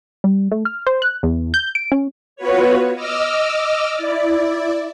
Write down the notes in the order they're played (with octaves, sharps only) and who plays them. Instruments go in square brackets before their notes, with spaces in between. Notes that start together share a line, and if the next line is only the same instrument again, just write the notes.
[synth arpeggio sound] G3
A3
F6
C5
F#6
E2
G6
D7
C#4
[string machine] B3 F4 F#4 B4 C#5
D#5 D6 E6 F6
E4 D5